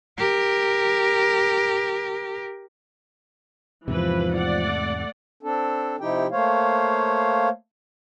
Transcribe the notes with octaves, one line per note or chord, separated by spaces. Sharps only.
G4 A#4
E2 G#2 C3 E3 F3 B4
A3 D5 F#5
C4 D4 A4
C3 F3 D#4 E4 G4 G5
A3 A#3 C5 C#5 F5